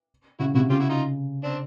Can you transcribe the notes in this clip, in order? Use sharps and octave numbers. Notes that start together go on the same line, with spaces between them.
C#3 E4 F#4
C3 E4 F#4
C#3 F4 G4
E4 F#4
D#4 F4
C4 D4